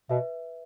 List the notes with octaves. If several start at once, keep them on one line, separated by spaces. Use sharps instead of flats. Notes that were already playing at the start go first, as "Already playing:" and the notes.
B2 B4 E5